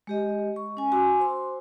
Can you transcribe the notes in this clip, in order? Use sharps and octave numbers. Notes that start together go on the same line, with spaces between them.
G#3 G4 D#5
C#6
C#4 G#5
F#4 G#5 C6 D6 E6
C5 C6